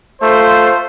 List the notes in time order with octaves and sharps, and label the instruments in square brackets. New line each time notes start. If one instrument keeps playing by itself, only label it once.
[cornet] A3 [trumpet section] F4 C5